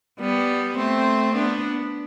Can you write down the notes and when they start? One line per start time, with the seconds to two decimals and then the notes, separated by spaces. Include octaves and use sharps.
0.20 G3 B3
0.77 A3 C4
1.34 B3 D4